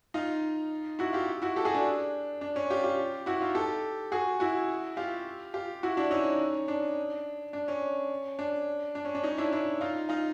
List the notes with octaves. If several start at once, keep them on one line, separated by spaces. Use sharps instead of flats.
D#4 F4
E4 F#4
F4 G4
E4 F#4
G4 A4
F#4 G#4
D4
D4
C#4
F4 G4
F4 G4
E4 F#4
D#4 F4
G4 A4
F#4 G#4
E4 F#4
F4 G4
F4 G4
E4 F#4
D4 E4
C#4 D#4
D4
D4
C#4
D4
D4
C#4
D4
C#4 D#4
D4 E4
D4 E4
D#4 F4
D#4 F4